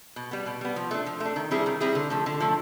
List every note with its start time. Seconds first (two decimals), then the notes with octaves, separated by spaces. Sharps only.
0.16 B2
0.31 G3 B3
0.46 B2
0.61 G3 B3
0.76 F3
0.91 A3 D4
1.06 F3
1.20 A3
1.25 D4
1.36 D#3
1.51 G3 C4 E4 G#4
1.66 D#3
1.81 G3 C4 E4 G#4
1.95 D3
2.10 F3 A3
2.26 D3
2.40 F3 A3